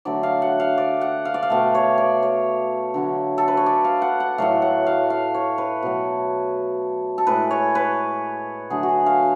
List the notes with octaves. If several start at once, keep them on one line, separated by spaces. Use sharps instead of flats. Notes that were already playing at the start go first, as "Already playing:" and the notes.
D3 F#3 A3 D5
F5
F#5
F5
D5
F#5
F5
D5
F5
B2 A3
C#5
D5
C#5
D3 F#3 A3
A4
B4
C#5
D5
F5
F#5
F#5
A2 F#3 A3 F5
F#5
F5
F5
C#5
B4
B2 F#3 A3
A4
A2 G#3 B4
C#5
B4
D3 F#3 A3 G#4
F#4
G#4
F5